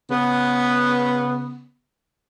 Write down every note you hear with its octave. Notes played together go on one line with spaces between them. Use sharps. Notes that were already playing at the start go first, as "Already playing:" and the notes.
C#3 B3